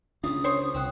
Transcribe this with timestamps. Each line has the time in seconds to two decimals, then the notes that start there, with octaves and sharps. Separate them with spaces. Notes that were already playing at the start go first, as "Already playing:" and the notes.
0.24 C#2 C#4 D4 D#6
0.44 C5 C#5
0.74 C2 C4 F#5